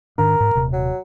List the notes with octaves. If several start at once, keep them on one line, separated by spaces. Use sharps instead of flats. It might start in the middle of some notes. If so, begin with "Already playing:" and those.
G#2 D#3 D4 A#4
G#2
D#1 C3
F#3